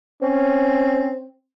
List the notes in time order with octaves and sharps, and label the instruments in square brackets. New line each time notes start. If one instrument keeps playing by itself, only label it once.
[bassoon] C4 [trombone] C#4